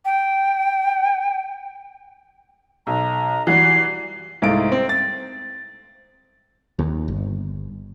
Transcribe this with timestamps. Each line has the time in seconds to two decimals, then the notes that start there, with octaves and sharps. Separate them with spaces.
0.05 G5
2.87 B1 A#5
3.47 E3 G3 F#4 D5 C7
4.42 C2 G#2 A3 F5 D7
4.72 C4
4.89 A6
6.79 D#2
7.08 G1